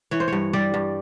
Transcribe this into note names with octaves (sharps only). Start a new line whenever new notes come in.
E3 C#5
C5
G2 C#5
G3 D5
G2